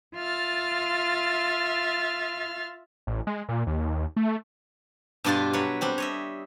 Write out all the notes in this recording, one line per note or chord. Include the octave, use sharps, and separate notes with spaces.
F4 E5 F6 A6
A1
G#3
A#2
D#2
A3
G2 B2 D4 F4 G4 A5
F#3 B4 C#5
G3 C4 D4
C#5 D#5 E5